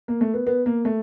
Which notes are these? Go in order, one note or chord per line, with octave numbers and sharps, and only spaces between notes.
A#3
A3
B3
B3
A#3
A3